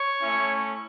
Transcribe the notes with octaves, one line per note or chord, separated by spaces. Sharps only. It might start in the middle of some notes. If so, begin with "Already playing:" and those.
Already playing: C#5
A3 C#4 E4